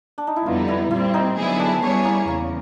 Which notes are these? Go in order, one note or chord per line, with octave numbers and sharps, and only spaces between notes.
D4
D#4
E4
F2 D3 G3 B3 D#4 F4
E4
A#2 G3 C4 E4
D#4
D3 F#3 B3 E4 G#4
D4
G3 B3 C#4 E4 G#4 C#5
A#3
E2 C#3 A#3